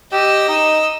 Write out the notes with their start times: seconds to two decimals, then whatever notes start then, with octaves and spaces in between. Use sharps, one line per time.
0.12 G4 D#5 E6
0.49 D#4